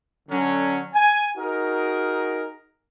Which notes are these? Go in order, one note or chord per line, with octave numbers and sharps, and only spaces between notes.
D3 F#3 C#4
G#5
D#4 F#4 G#4 A#4